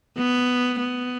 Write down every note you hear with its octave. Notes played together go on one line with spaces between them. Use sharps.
B3
B3